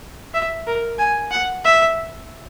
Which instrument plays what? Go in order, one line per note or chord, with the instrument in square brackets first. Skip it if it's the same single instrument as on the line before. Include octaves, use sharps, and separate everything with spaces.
[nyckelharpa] E5
A#4
G#5
F#5
E5